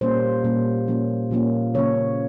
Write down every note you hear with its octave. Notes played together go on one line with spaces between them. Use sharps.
A#2 G3 A#3 C#4 C5
A#2 G3 A#3 C#4
A#2 F3 A#3 C#4
A#2 F3 A#3 C#4
C#3 F3 A#3 C#4 C#5